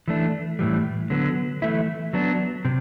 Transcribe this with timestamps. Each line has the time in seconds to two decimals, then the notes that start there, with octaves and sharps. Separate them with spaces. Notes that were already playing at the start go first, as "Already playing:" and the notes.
0.08 E3 A3 D4
0.59 A2 E3 G3
1.10 D3 F#3 B3
1.62 E3 A3 E4
2.13 F#3 B3 D4
2.65 C3